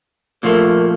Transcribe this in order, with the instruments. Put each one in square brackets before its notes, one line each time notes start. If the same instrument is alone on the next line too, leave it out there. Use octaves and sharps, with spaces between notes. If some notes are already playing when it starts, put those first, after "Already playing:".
[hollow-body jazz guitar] A#2 F3 A3 [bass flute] A#4